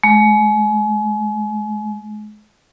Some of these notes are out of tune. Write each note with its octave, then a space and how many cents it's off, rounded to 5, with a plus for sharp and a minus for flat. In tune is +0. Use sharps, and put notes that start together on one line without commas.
G#3 +35